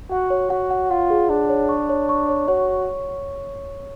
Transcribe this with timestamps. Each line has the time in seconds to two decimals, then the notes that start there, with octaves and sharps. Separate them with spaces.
0.11 F#4 F#5
0.30 C#5
0.50 F#4 F#5
0.71 F#5
0.90 F4 F#5
1.10 G#4
1.29 D4 G#4
1.49 C#5
1.69 C#6
1.89 C#5
2.09 C#6
2.29 C#5
2.48 F#4 C#5